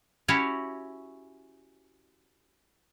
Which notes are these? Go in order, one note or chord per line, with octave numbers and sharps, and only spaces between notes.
C#4 E4 F#4 G4 C#5